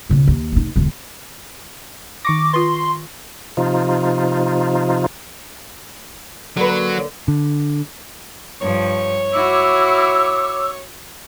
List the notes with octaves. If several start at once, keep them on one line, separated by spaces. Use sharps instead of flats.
C#2 B2
D#2
F1 D#4
E1 D3
D#3 C#6 D6 A#6
F4 B4 C6
C3 F3 D#4 F4
D3 F#3 A#3 B4
D3
G2 F3 C#5
E4 F#4 D6 E6